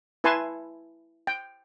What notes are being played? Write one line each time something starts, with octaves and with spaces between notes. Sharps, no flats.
E4 B4 G#5 A5 C6
G5